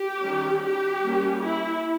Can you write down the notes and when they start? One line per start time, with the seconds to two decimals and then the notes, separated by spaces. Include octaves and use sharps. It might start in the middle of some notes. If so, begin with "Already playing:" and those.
Already playing: G4
0.23 D#3 G3 C#4
0.63 G4
1.03 G3 A#3 C#4
1.43 E4